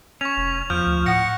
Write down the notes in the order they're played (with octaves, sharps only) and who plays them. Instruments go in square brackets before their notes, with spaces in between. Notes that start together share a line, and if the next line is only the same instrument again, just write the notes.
[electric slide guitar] C#4 [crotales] C#6 F7
[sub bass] F1
[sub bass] E2 [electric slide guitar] F3 [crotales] F6 G6
[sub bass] D2
[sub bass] A2 [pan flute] F#5 [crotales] F#6 A#6 C#7